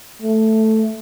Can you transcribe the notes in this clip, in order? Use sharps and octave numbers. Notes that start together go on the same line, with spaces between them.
A3